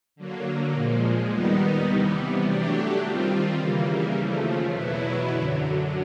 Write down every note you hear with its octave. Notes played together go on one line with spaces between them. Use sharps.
D3 F#3 A#3
A#2 F3 G#3
D#2 D#3 G3 B3 D#4
C3 E3 G3 B3
F#3 A3 D4 G4
D#3 G3 C4 F4
C#3 E3 G3 A#3
D#2 C#3 F3 A3
E2 B2 F#3 B3 E4
F#2 D3 F#3